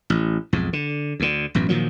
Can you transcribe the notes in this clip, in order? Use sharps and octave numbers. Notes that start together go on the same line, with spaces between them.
A1
B1 F2 G#2
D3
D2 D3
A1 F#2 B2
A#2 D#3 F3 F#3